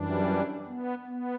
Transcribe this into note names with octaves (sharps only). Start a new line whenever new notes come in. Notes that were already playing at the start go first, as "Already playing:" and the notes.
Already playing: F#2 E3 G3 D4
B3
B3